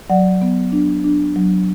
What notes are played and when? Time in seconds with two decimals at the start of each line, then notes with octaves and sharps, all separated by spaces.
0.09 F#3 D5 F#5
0.42 B3
0.72 D4
1.04 D4
1.36 F#3